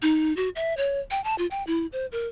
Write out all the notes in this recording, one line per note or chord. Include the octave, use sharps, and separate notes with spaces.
D#4
F#4
E5
C#5
G5
A5
F4
G5
E4
C5
A#4